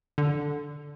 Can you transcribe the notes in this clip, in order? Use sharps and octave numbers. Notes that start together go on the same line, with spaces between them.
D3